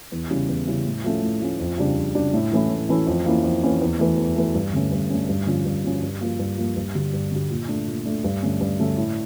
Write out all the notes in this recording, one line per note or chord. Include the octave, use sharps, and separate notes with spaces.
E2
C#3 G3 C#4 E4
E2
C#3 G3 C#4 E4
A2
F3 A3 C#4
A2
F3 A3 C#4
F2
C#3 G3 D4
F2
C#3 G3 D4
A2
E3 A3 C#4 E4
A2
E3 A3 C#4 E4
F2
E3 A#3 C#4 E4
F2
E3 A#3 C#4 E4
E2
E3 A3
E2
E3 A3
G2
D3 A3 C#4
G2
D3 A3 C#4
G2
D3 F3 C#4
G2
D3 F3 C#4
G2
F3 A#3
G2
F3 A#3
G2
D3 G3
G2
D3 G3
A#2
A3 D4
A#2
A3 D4
G2
D3 A3 C#4
G2
D3 A3 C#4
A2